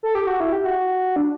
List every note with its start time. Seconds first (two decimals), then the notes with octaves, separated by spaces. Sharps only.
0.03 A4
0.15 G4
0.27 F#4
0.40 E4
0.53 G4
0.65 F#4
1.16 D4